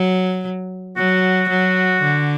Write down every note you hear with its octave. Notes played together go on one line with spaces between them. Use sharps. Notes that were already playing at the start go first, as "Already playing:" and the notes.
Already playing: F#3
F#3 F#4
F#3
D3